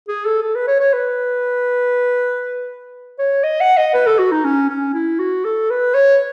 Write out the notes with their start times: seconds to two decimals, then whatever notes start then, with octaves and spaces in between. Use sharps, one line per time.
0.08 G#4
0.26 A4
0.43 A4
0.55 B4
0.67 C#5
0.80 C#5
0.93 B4
3.19 C#5
3.44 D#5
3.61 F#5
3.77 D#5
3.94 B4
4.06 A4
4.19 F#4
4.32 D#4
4.45 C#4
4.69 C#4
4.94 E4
5.19 F#4
5.45 A4
5.70 B4
5.95 C#5